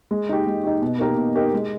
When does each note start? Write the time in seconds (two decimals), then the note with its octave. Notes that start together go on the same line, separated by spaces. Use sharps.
0.11 G#3
0.29 D#4 G4
0.47 G#3
0.64 D#4 G4
0.82 B2
0.99 A#3 D#4 G4 A#4
1.17 B2
1.35 A#3 D#4 G4 A#4
1.53 G#3